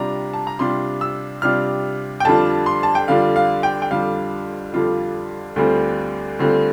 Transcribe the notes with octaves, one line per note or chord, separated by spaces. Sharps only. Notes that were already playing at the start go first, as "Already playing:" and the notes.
Already playing: C3 G3 D4 F4 A#5
A5
A#5
C3 G3 D4 F4 C6
E6
C3 G3 D4 F4 F6
G5
F2 D3 G3 D4 F4 A5
C6
A5
G5
F2 D3 G3 D4 F4 F5
F5
G5
G5
F2 D3 G3 D4 F4 F5
F2 D3 G3 D4 F4
D2 D3 G3 C4 F4
D2 D3 G3 C4 F4